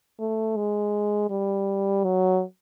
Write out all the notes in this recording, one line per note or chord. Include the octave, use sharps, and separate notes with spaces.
A3
G#3
G3
F#3